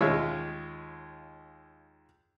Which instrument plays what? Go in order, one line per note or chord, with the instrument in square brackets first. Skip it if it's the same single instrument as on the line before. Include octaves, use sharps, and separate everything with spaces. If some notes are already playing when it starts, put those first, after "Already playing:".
[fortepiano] D#2 G#3 F4 C#5 E5